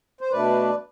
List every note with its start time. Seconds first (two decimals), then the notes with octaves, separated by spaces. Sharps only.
0.21 C5
0.31 B2 A3 D4 B4 D5